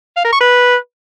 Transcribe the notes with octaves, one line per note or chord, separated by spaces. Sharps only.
F5
A#4
C#6
B4